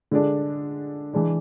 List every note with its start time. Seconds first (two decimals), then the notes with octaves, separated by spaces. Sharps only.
0.11 D3 G#3 D4
1.14 E3 G#3 D4